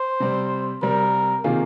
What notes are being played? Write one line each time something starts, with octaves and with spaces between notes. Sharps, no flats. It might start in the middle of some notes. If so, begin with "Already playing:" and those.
Already playing: C5
C3 G3 C4
C3 G3 C4 A#4
C3 D#3 A#3 F4 G#4